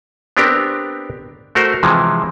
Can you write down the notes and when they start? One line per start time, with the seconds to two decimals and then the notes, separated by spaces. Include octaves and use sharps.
0.37 B3 C4 D4 G4 A#4
1.55 A3 F#4 A#4 C5
1.83 C3 E3 F3 G#3